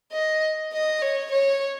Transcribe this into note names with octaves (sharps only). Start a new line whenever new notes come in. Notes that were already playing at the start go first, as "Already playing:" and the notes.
D#5
D#5
C#5
C#5